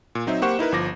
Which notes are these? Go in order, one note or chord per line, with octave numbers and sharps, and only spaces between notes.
A#2
F#3 C4 D#4 C5 E5
A#3 G4 C5 F#5 C#6 E7
D#4 E4 A#4 B4
G1 F3 D6 A#6